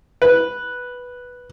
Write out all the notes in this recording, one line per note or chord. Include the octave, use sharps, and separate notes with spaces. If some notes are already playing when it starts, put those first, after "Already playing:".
B4